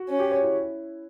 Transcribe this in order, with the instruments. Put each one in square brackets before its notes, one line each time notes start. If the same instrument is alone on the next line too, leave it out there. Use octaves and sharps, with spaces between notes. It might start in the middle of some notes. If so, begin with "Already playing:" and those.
Already playing: [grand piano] F#4
[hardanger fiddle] C#4
[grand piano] G4
C#5
E4